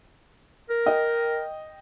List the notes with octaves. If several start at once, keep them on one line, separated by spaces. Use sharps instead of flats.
A#4
D#5 G5